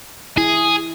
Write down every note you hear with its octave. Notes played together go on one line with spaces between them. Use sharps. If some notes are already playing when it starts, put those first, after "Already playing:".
E4 G#4